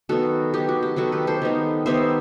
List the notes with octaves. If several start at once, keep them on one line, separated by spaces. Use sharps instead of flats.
D#3 F#3 B3 F#4 A4
D#3 F#3 B3 G4
F#4
G4
D#3 F#3 B3 F#4 A4
G4 B4
A4 C5
D#3 G3 B3 D#4
D#3 G3 B3 D#4 C5 E5